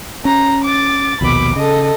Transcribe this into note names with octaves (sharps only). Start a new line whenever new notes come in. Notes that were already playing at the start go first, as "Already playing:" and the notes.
C#4 A#5
D6 A6
A#1 D#2 B2 B5 D6
C#3 A4 D#5